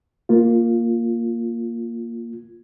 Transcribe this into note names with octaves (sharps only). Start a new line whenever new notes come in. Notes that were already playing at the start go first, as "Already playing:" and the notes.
A#3 F4